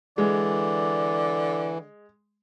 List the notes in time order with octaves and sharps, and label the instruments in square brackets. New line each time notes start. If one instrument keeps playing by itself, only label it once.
[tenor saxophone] D3 [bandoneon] E3 [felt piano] G#3 [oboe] D5